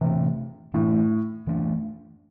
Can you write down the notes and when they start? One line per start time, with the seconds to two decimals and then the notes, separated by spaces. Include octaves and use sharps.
0.01 C3 E3 A3 D4
0.74 A2 E3 A3 D4
1.47 E3 A3 D4